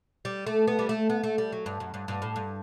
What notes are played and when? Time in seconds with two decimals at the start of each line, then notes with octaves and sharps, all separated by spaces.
0.25 G3
0.47 A3
0.67 B3
0.79 G3
0.89 A3
1.10 B3
1.23 A3
1.38 G3
1.52 F#3
1.66 G2
1.80 F#2
1.94 G2
2.08 G2
2.22 A2
2.36 G2